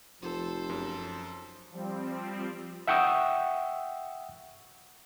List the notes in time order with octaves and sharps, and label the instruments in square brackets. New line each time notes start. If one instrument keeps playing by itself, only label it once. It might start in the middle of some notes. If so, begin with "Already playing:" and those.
[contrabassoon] F1 [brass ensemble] F3 [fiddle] A4 C5
[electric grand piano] F#2
[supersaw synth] F3 G3 C4
[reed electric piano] E5 F#5 G5 C#6 D#6 E6